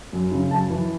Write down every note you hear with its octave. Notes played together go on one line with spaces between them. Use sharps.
F#2
C#3
F#2 A5
E3